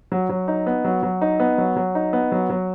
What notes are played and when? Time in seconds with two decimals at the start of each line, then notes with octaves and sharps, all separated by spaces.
0.12 F#3
0.29 F#3
0.48 D#4
0.67 B3
0.85 F#3
1.03 F#3
1.22 D#4
1.40 B3
1.58 F#3
1.76 F#3
1.95 D#4
2.13 B3
2.32 F#3
2.50 F#3